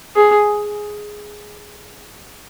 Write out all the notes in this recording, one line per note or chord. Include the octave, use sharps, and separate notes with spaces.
G#4